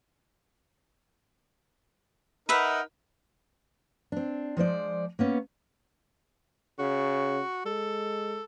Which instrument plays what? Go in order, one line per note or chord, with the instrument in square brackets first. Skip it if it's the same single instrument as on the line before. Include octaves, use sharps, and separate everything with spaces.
[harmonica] D#4 A#4 [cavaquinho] B4 E5 F#5
[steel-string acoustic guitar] C4 D4
F3 G#3 C5 D5
A#3 B3 C#4
[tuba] C#3 [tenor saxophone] F#4
[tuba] G#3 [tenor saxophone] A4